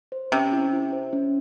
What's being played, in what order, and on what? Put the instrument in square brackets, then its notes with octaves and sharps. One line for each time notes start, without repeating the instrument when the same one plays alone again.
[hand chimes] C5
[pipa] C3 [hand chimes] C#4
[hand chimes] E4
E4
C5
C#4